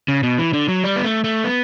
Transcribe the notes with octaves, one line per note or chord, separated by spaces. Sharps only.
C#3
B2
E3
D3
F#3
G3
B3
A3
A3
B3